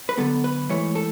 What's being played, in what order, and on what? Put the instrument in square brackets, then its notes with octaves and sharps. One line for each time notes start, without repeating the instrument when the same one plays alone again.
[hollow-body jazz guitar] B4
D3 F#3 B3 A4
B4
G#2 E3 A3 C#5
A4